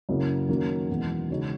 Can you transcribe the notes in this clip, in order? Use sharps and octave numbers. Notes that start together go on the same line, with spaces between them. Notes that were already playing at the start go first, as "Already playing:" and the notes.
F#2 C#3 F#3 A#3 E4
D#3 F#3 A#3 C#4
E2 B2 G#3 B3
C#3 G#3 D#4 F#4 C#5